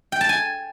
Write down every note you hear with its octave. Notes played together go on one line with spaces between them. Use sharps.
G5
A5
G#5